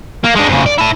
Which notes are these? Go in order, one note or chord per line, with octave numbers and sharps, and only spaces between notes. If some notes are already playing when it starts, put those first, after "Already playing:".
A#3
G#3 D4
F2 C#3
D5
E4 A5